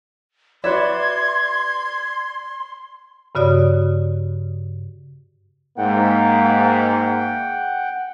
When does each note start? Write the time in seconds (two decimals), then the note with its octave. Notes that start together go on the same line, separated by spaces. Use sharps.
0.64 F#4 B4 D5 E5 C6 G#6
3.35 G2 C#3 F#4 D5 D#6
5.78 G#2 A#3 F#5 G5